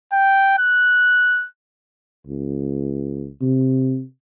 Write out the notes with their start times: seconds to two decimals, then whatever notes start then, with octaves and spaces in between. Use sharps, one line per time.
0.13 G5
0.58 F#6
2.27 C#2
3.42 C3